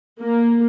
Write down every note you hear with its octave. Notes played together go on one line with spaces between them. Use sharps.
A#3